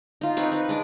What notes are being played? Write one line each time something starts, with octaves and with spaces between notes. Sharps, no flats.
D#4 F4
C4 D#4 B4 C#5
D#4 B4
G#3 D4 D6